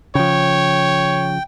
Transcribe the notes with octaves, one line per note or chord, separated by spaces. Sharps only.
C#3 F3 C#5 G5